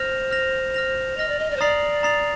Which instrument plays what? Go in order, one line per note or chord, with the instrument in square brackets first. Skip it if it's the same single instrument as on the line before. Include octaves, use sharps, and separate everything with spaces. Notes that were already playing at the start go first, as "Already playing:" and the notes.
Already playing: [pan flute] C5 [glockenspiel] F6 A#6 F7
[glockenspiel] F6 A#6 F7
F6 A#6 F7
[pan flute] D#5 [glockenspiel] F6 A#6 F7
[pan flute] D5
D#5
D5
C5
[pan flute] D5 [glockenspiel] A#5 D#6 A6 C7 F7
[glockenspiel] A#5 D#6 A6 C7 F7